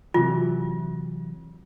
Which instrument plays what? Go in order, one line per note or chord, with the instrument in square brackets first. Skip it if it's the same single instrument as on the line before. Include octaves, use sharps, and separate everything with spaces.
[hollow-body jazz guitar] C3 E3 F#3 [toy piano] F4